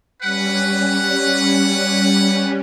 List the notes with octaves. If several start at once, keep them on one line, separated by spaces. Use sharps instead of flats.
G3 C#4 B4 F#5